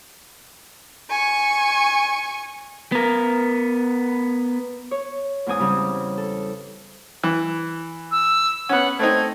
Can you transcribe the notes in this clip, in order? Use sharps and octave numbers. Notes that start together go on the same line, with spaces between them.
G#5 C#6
B3 A#4
C#5
E2 G#2 C4 G#5 D#6
C#3 G3 C4
A4
E3
E6
B3 C#4 F#5
A3 C4 D#4 G#6